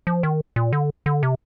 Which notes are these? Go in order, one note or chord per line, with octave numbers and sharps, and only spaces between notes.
F3
D#3
A#2
D3
D3
C3